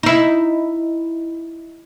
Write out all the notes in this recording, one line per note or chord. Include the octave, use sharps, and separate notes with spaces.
D#4 E4